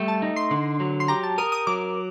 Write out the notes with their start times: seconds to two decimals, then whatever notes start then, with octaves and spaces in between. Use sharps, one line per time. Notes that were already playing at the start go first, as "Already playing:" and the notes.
Already playing: G3 A3
0.08 A5
0.22 D#4
0.36 C6
0.51 D3
0.80 F#3
1.00 C6
1.08 G4 A#5
1.23 A5
1.38 A#4 D#6
1.52 D#6
1.67 F#3 D6